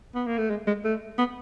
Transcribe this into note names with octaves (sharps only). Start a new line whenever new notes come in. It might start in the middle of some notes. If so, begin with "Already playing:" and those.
B3
A#3
A3
G#3
G#3
A3
B3